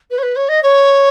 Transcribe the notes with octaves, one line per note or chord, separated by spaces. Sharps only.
B4
C#5
B4
C#5
D#5
C#5